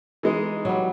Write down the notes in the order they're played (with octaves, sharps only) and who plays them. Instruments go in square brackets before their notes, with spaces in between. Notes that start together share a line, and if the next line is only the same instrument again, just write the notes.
[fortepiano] E3 G#3 D#4
[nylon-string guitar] F#3 G3